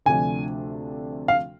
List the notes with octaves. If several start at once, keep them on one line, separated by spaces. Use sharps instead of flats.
D2 C3 F3 A3 D4 G#5
F5